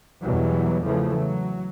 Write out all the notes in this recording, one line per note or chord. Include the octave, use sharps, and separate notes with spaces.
E2 B2 E3 F#3 G3
C#3 E3 F3 A3
F#3